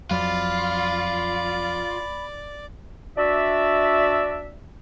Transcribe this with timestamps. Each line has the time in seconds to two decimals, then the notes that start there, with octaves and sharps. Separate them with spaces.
0.11 F2 F#3 F4 D5 B5
3.18 D4 F#4 D5 E5